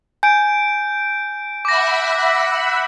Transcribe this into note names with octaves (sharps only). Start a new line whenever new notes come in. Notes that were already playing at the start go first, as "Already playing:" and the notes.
G#5 G6 D7
E5 F#5 B5 D6 A#6